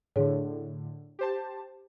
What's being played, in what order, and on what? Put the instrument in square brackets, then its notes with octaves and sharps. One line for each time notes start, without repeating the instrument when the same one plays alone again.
[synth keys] A2 D3 [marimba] D4 G#4 C#5
[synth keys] G4 C5 A5